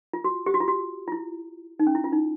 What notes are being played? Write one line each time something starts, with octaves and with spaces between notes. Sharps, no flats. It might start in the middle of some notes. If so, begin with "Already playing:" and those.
F4
F#4
G4
F#4
F4
F#4
F4
E4
D#4
C#4
E4
F4
D#4